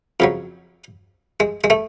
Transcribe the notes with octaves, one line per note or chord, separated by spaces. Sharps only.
F2 C#3 F#3
G#3
G#3
A3